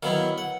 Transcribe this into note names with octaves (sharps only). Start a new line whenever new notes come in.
D#3 F#3 B3 E4 F5
F#5